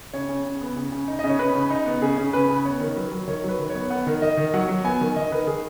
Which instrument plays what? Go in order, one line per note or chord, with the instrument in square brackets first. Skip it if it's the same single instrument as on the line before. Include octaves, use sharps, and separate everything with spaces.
[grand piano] C#3 C#5
C#3
C#3
B3
C#3
C#3
D#4
C#3 D#5
C#5
C#3 B4
C#3
D#4
B3
C#3 G#4
C#3
C#3 B4
C#3
B3 C#5
D#3
F#3 B4
F#3
D#3 C#5
F#3 B4
D#3
C#5
B3
B3 F#5
D#3
D#3 D#5
D#3
F#3 F#5
F#3
B3 G#5
D#3
D#3 D#5
D#3 B4
D#3 G#4